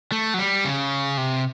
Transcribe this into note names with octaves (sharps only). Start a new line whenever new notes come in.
A3
F#3
G3
C#3
C3